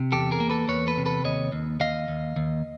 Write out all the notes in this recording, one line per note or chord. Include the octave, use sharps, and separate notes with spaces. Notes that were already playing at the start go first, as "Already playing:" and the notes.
Already playing: C3
E2 G4 A4
G#4 A#4
A#3
A4 B4
E2 B4 C#5
A4 B4
C3
A4 B4
D#2 C#5 D#5
D#2
D#2 D#5 F5
D#2
D#2